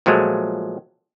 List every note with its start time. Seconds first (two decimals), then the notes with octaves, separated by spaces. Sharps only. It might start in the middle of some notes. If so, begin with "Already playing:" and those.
0.06 A#2 F3 F#3 G#3 A3